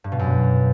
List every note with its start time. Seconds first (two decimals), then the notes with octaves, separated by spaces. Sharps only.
0.04 G2
0.12 B2
0.19 F#2